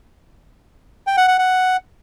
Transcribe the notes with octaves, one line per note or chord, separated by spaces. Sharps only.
G5
F#5
F#5
F#5